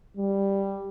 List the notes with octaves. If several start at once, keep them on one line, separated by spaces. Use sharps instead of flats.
G3